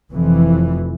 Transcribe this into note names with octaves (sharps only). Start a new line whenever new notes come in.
F1 F2 E3